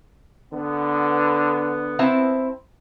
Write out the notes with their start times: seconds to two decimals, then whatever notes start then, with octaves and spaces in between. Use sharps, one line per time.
0.53 D3 B3
1.99 C4 E4 A5